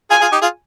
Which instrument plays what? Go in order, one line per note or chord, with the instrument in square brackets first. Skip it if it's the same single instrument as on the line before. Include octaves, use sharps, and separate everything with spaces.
[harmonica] F4 G#4 [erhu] G#5
[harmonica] F4 G#4
D#4 G4
F4 G#4